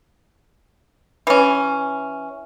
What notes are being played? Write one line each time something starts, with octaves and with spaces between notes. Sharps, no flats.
E3 C#4